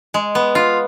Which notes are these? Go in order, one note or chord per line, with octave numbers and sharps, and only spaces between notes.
G#3
B3
F4